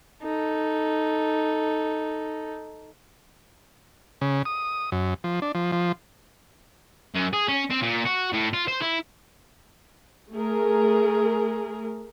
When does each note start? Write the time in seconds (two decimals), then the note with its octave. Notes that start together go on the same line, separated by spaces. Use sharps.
0.23 D#4 A4
4.21 C#3
4.45 D#6
4.92 F#2
5.24 F3
5.42 D4
5.55 F3
5.72 F3
7.14 F#2
7.33 G#4
7.48 C#4
7.70 C4
7.82 A#2
8.06 F#4
8.33 A2
8.53 F4
8.68 C5
8.82 E4
10.32 A3 G#4 A#4